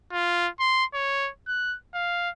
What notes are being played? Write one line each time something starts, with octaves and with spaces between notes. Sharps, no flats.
F4
C6
C#5
F#6
F5